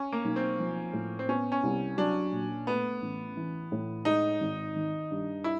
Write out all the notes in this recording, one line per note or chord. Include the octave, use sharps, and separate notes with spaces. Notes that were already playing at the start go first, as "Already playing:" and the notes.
Already playing: C#4
A#3
B1
C4
F3
A2
C4
B3 C#4
C#4
C2
F#3 D4
A#2
A3 B3
A1
E3
A2
G#3 D#4
G#1
D#3
G2
E4